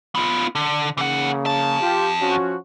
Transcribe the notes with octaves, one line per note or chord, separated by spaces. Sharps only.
B3 F4
D3
C#3 E3 A#3 F#5
F2 A5
F4 G4
F3 C#4 F#4